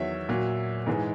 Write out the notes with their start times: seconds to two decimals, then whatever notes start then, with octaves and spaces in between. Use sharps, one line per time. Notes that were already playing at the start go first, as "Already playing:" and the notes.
Already playing: E2 D#3 F#3 C#5 E5
0.29 A#2 F#3
0.86 G#2 E3 G#3